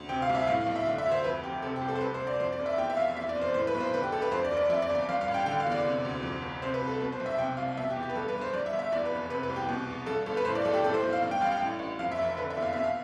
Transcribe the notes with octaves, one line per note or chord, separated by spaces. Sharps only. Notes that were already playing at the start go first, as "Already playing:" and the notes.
Already playing: D2
C3 G5
F5
C2
E5
A2 F5
F5
B1
E5
D3 F5
E5
D2
C5
F2 B4
F1 G4
C3 A4
G4
C2
A4
C5
C3 B4
C5
D2
D5
F2 C5
D5
F1
E5
E2 G5
E5
F1 F5
E2 E5
D5
F1
C5
A2 C5
B4
B1
C5
D3 B4
G4
D2 A4
B4
F2 C5
D5
F1
D5
F2 E5
D5
G1
D5
G2 F5
F5
A1
G5
D3 G5
F5
E2
D5
C3
D2
F2
G1
C3 C5
B4
C2
A4
B2 B4
C5
B1
E5
C3 G5
C2 F5
B2 E5
G4
E2
G4
B4
G2 A4
B4
G1
C5
G2 D5
E5
G1
E5
E2 D5
B4
F1
C3 B4
B4
C2
G4
B2
E2
G2 A4
G1 A4
B4
A2 C5
D5
B1 A4
G4
A2 A4
C5
B1
F5
G2
G5
A1 F5
G5
A2
A1
F2 F5
E5
F1
D3 B4
E5
E2
F5
B2 E5
F5